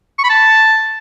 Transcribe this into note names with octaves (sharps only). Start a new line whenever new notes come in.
C#6
B5
A5